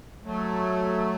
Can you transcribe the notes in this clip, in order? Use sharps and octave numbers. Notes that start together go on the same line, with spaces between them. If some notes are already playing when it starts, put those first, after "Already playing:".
F#3 A3